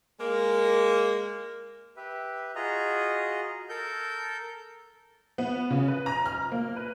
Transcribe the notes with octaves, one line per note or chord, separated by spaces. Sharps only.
G#3 A#3
G4 B4 E5
F4 F#4 G#4 D#5 A#5
A4 A#4 G6
B3
C#3
B4
A#5
F6
A#3
B4